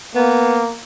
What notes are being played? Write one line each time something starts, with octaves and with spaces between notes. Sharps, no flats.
A#3 B3